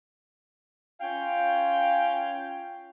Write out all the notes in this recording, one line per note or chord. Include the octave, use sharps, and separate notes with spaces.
C#4 F4 F5 G5